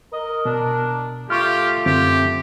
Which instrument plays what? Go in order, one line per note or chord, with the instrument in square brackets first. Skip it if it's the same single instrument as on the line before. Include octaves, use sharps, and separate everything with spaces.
[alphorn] A#4 [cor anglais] D#5
[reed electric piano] B2 [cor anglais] D4
[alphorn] A3 [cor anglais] F4 [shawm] G4 [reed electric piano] C#6 F6
[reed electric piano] F#2 D3 C4 [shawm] G4